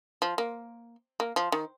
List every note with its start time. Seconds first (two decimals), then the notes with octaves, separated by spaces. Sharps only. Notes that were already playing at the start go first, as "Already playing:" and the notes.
0.22 F3
0.38 A#3
1.20 A#3
1.36 F3
1.52 D#3